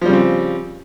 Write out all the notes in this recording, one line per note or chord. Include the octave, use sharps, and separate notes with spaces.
C#3 F3 G3 C4